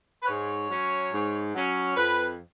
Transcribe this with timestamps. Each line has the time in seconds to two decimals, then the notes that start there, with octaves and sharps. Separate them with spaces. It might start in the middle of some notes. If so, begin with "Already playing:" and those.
0.23 B4
0.27 G#2 C#5
0.70 F#3 C#4
1.12 G#2
1.54 F#3 C#4
1.97 F2 B4